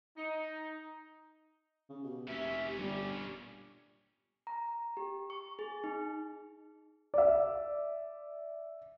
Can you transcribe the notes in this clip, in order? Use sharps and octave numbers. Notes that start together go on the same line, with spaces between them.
D#4
C#3
B2 G4
F1 A#2 C#4 E5
G1 G3
A#5
G4
C#6
G#4
D#4
D5 E5